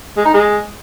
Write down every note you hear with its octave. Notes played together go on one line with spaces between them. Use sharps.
G#3
D#4
G#3